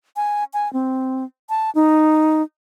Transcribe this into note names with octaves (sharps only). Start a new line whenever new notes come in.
G#5
G#5
C4
A5
D#4